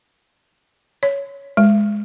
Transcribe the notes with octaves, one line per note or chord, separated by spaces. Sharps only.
C#5
G#3